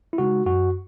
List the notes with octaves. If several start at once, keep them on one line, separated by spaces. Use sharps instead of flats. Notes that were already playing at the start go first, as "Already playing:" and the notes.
E4
C#3 G#3 D#4 F#4
F#2 F#4